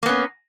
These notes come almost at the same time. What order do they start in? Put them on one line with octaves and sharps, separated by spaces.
A#3 B3 C#4